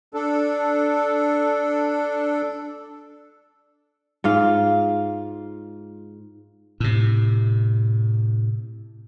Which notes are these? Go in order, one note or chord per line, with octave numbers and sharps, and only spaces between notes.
D4 A4
G#2 F4 F5
A2 C3